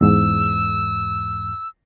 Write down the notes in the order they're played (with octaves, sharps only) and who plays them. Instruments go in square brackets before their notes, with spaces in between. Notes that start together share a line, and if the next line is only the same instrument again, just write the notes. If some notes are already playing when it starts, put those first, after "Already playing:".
[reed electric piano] E2 G#2 [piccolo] E6